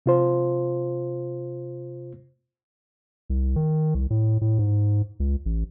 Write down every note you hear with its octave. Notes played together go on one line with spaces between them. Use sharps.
C3 F4 C5
C2
D#3
C2
A2
A2
G#2
C#2
A1